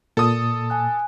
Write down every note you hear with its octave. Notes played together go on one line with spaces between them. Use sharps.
A#2 A4 D#6
G#5 F#6